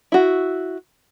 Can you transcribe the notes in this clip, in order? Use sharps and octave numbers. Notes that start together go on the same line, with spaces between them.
E4 F#4